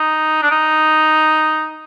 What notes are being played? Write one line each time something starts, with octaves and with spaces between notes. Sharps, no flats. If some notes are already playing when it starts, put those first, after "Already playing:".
Already playing: D#4
D4
D#4